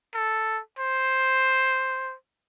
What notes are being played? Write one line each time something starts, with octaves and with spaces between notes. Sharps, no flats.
A4
C5